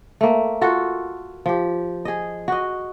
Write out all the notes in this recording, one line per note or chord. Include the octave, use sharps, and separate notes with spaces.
A3 A#3
F4 F#4 A4
F3 G4
G#4 D#5
F#4 D#5